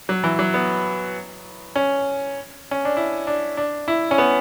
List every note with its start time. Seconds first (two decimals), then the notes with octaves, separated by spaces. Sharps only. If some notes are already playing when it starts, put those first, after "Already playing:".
0.09 F#3
0.24 E3
0.39 F#3
0.54 B3
1.76 C#4
2.71 C#4
2.85 D4
2.97 E4
3.27 D4
3.57 D4
3.88 E4
4.11 C#4
4.18 B3